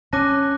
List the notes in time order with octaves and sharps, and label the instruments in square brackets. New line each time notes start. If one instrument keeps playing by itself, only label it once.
[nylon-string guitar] C#4 [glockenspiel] A5 D6 F#6 A#6